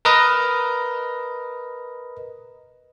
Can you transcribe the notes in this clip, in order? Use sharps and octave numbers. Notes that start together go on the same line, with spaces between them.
A#4 B4 D#5